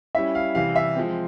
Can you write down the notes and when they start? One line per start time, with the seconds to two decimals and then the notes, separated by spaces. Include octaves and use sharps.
0.15 G3 C#4 E4 E5
0.35 F5
0.55 C3 E3 G3 F5
0.76 E5
0.96 F3 G#3 C4